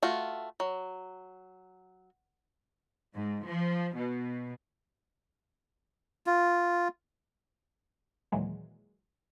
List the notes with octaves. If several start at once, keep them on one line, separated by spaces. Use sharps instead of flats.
A3 F4 F#4
F#3
G#2
F3
B2
F4
D#2 A#2 E3 F#3 G#3